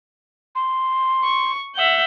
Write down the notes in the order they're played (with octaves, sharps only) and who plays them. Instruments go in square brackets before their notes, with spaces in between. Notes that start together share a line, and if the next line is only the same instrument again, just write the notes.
[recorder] C6
[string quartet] C#6
E5 F#5 G6